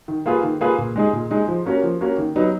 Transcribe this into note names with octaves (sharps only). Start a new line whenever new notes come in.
D#3
A#3 F4 G#4 B4
D#3
A#3 F4 G#4 B4
A#2
G#3 D#4 G#4
A#2
G#3 D#4 G#4
F3
A#3 C#4 F#4 A#4
F3
A#3 C#4 F#4 A#4
D#3
F#3 B3 D#4